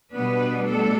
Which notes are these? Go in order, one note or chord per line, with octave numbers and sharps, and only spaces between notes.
B2 G3 B3 D4 B4
A3 A4